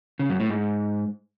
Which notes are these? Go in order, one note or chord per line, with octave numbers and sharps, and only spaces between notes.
C#3
F#2
A2
G#2